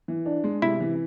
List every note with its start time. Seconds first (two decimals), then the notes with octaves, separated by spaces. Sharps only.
0.08 E3
0.26 D4
0.44 G#3
0.62 C3 E4
0.80 E3